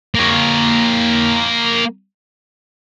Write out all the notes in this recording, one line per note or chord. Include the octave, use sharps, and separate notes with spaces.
A#3 C#5